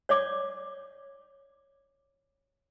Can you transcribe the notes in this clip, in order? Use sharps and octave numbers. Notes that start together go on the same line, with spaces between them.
C#5 D5 D6